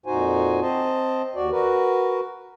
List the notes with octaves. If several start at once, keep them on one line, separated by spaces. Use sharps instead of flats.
F2 A#2 D#4 F#4 C5 G#5
C4 C5 D#5 A5
D#2 F#4 D5
F#4 A#4 B4